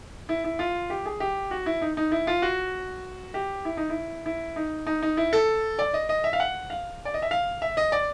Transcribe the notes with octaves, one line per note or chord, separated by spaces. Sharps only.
E4
E4
F4
G4
G#4
G4
F#4
E4
D#4
D#4
E4
F4
F#4
G4
E4
D#4
E4
E4
D#4
D#4
D#4
E4
A4
D5
D#5
D#5
E5
F5
F#5
F5
D5
D#5
E5
F5
E5
D#5
D5